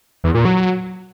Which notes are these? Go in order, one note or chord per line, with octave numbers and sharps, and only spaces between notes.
E2
A#2
F#3